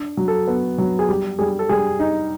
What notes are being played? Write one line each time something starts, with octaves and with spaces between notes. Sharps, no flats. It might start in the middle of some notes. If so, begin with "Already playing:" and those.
Already playing: D4
F#3
A4
B3
F#3
G#4
G3 G4
G3 G#4
A4
G3 G#4
D#4